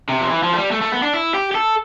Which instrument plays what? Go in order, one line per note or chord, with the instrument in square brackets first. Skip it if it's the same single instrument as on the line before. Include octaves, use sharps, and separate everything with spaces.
[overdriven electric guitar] C3
F3
E3
F3
A3
G3
A3
A3
B3
D4
E4
G4
G4
A4